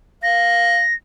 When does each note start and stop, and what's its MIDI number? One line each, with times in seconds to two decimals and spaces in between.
0.23 0.76 77
0.23 0.94 94